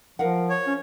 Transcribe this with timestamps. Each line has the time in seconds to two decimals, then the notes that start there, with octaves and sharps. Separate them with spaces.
0.19 F3 A#4 F5 F#5
0.50 C#5
0.67 C#4